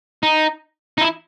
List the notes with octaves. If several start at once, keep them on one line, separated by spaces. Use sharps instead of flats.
D#4
D#4
E4